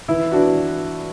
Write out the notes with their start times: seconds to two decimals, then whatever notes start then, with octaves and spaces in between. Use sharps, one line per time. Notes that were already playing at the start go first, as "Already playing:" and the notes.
0.08 E3 E4
0.31 B3 D4 F#4
0.54 E3